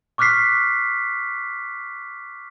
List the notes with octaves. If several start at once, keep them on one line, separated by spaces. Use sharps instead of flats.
C#6 D6 F6 F#6 B6 C7